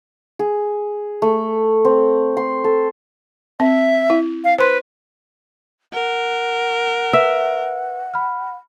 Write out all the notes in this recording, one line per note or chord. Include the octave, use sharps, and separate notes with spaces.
G#4
A3
C4
C6
A4
C4 E5
E4
F5
B4 C5 C6
A#4 F#5
B4 E5
B5 F6